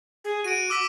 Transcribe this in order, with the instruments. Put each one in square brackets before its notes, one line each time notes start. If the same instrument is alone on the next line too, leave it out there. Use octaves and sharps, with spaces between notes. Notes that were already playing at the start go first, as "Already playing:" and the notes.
[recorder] G#4
[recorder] F#4 [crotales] D7 D#7
[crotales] D6 E6 B6